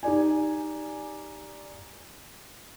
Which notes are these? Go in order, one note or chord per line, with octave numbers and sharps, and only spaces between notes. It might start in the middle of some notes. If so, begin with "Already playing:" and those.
D#4 G4 D5 G#5